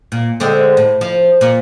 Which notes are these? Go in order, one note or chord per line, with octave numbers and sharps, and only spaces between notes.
A#2
D3 G#3 C4
A2
F3
A#2